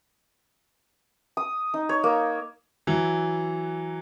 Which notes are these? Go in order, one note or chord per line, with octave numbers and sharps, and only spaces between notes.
D#6
D#4
C#5
A#3
E3 F#3